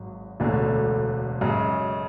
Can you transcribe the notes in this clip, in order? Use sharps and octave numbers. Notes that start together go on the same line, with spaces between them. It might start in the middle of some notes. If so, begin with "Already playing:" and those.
Already playing: G#1 G#2 F#3
E1 D2 D3 A3 C#4
F#2 C#3 G#3